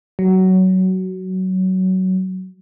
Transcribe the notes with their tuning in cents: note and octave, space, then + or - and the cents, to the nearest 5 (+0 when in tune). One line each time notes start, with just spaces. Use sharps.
F#3 +15